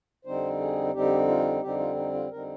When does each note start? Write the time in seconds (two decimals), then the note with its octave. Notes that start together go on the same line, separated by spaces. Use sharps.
0.25 F2 D3 G3 C4 D#4 C5
0.60 G#4
0.93 F2 D3 G3 C4 D#4 G4
1.28 F4
1.62 F2 D3 G3 C4 D#4 G4
1.79 F4
1.96 D#4
2.13 F4
2.31 F2 D3 G3 C4 D#4 A#4